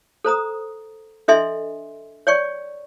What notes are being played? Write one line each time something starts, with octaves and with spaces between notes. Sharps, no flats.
A4 C5 A#5 D#6
D4 A4 D#5 E5 G#5 C6
C#5 D5 G5 C#6